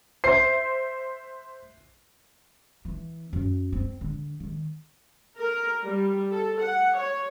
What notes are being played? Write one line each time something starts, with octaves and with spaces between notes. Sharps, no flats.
C5 E5 C7
E3
F#2
C4
D3
D#3
A#4
G3
A4
F#5
C#5